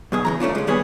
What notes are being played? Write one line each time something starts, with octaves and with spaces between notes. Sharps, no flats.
F#2 B2 G#4
C#3 E3 A#5
A3 C#4 D4 F4
C#2 G#3
D#2 G3 B3 C#4 G#4